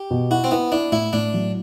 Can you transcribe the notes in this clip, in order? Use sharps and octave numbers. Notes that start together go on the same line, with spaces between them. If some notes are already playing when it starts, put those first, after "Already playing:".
Already playing: G4
B2
E4 F#4
C4
B3 E4
D4 E4
A2 E4
A2 D4
F#3